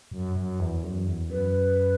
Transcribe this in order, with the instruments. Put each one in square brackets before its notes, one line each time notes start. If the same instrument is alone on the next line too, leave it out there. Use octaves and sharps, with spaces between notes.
[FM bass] F#2
F#2
E2
F#2
E2
[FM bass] F#2 [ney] B4